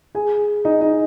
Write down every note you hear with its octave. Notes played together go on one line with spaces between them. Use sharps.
G#4 G#5
D#4 D#5
D#4 D#5